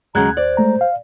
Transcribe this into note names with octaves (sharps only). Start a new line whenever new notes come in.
D#2 C#3 F#3 G#3 A#5 F#6 G#6
C5 D5
G#3 A3 A#5
F5